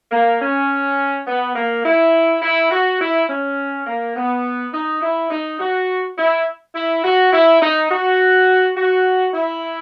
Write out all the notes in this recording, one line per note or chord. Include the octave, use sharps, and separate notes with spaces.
A#3
C#4
B3
A#3
E4
E4
F#4
E4
C#4
A#3
B3
D#4
E4
D#4
F#4
E4
E4
F#4
E4
D#4
F#4
F#4
E4